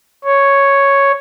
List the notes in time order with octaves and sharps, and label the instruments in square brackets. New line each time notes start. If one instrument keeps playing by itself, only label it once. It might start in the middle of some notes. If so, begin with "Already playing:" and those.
[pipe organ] C#5